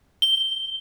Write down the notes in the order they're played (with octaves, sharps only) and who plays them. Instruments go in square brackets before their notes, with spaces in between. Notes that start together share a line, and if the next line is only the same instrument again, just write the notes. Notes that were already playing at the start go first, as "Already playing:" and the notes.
[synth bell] G7